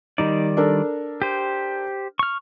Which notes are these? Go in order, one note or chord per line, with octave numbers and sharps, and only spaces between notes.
D#3 G3 D#4 D5
D4 A4 A#4
G4 C5
C#6 F6